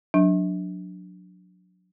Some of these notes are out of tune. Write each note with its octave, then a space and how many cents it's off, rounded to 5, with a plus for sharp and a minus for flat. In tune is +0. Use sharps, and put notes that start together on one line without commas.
F#3 -30 D4 +0